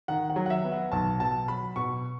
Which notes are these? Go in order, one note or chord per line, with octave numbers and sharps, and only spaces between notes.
D#3 F#5
F#5
F#3
F#5
E5
B3
F#5
B1 A5
B2 A5
F#3 B5
B2 C#6